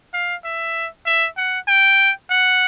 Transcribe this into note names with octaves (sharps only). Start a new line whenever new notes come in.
F5
E5
E5
F#5
G5
F#5